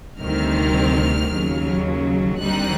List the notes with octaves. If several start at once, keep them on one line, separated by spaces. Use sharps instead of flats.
D2 C3 D#3 G3 C4 F6
D#2 C#3 F#3
D#2 D3 G3 C4 D#4 F#6